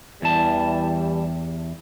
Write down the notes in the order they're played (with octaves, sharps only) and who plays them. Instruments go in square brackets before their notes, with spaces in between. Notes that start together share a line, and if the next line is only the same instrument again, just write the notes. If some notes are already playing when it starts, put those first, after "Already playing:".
[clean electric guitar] E2 A5 [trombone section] E3 G3